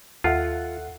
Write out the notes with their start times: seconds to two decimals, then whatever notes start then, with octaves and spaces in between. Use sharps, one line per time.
0.24 D#2 F4 A4 E5 F#5